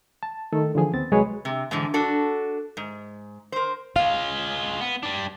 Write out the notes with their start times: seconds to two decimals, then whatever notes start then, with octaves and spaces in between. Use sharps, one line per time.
0.23 A5
0.53 D#3 A3 A4
0.75 D3 E3 F3 G#4 G#5
0.93 D#2 B3 C4 A6
1.12 C2 F#3 G#3 G#4 B4 C#5
1.45 C3
1.71 G#2 B2 D3 E3
1.94 D4 F#4 A4
2.77 G#2
3.52 A#4 C5
3.96 G#3 F4 F5
4.81 B3
5.03 G3 D4